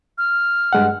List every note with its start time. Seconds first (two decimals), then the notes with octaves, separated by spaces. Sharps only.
0.18 F6
0.73 G2 G#3 F#5